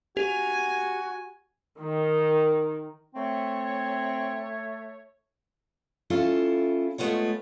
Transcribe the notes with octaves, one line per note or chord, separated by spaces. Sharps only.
F#4 G4 G#5
D#3
A3 C4 C#5
C#4 E4 F4 A4
G#3 A3 B3 F4 C#5